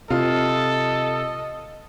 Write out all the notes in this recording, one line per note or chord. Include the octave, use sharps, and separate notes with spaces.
C3 F4 A4 D#5